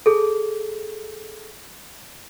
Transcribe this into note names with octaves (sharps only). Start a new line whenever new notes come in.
G#4 A4